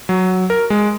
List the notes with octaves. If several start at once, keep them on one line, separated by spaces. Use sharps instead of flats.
F#3
A#4
G#3